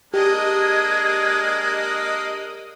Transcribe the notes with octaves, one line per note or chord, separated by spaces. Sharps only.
G#3 A#3 D4 G4 D#5 D#6 G#6